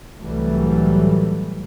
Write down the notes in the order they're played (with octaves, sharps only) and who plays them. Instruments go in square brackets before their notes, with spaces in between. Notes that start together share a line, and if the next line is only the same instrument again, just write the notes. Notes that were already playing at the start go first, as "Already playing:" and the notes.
[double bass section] C2 A2 E3 F#3 G3 A3